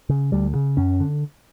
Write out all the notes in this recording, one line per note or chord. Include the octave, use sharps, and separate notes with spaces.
C#3
D2 G3
C#3
F#2 C#4
D3